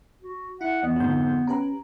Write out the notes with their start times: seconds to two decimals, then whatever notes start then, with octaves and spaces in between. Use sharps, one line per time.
0.22 F#4
0.61 E4 F#5
0.83 E2 B3 D#5
0.96 F2 G#2 D3 F3 G6
1.47 C#4 G4 B4 A#5